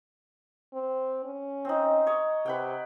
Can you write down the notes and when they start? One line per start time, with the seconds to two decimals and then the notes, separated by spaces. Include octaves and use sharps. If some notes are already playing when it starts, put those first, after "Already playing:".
0.74 C4
1.24 C#4
1.65 C4 D#4
2.07 C#5 D#5
2.46 C3 B4 F#5 G5